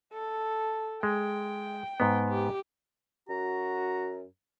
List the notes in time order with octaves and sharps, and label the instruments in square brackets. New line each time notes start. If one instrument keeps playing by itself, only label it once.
[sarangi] A4
[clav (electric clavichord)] G#3 [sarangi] G5
[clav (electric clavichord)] G#2 B3
[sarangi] G4
[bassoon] F#2 [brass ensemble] F#4 [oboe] A#5